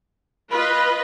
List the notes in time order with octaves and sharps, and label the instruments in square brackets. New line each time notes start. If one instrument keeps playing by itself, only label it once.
[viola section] F4 B4 D#5 [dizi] B5